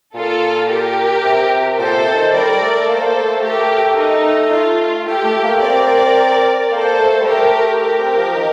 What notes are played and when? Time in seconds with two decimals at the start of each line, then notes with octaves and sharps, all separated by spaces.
0.15 A#2 F4 A4
0.69 G4 A#4
1.24 C3
1.78 A#2 A4 C5
1.97 C3
2.14 D#3
2.33 G3 A#4 D5
2.61 A3
2.88 A#3 A4 C5
3.07 A#3
3.24 A3
3.43 A3 G4 A#4
3.97 D#4
4.52 F4
5.07 A3 G4
5.25 A3
5.44 A#3
5.61 C4 A#4 D5
6.71 A#3 A4 C5
6.99 A3
7.20 G3
7.26 A3 G4 A#4
7.80 G4 A#4
7.98 C4
8.18 F3
8.35 D#3